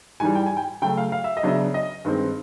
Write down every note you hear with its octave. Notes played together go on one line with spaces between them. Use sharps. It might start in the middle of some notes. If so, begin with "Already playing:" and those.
G#2 E3 G3 G#5
G5
G#5
G5
C#3 F#3 A3 G5
F5
F5
E5
D#5
C#3 F#3 B3 D4 E5
D#5
G2 D#3 G#3 C4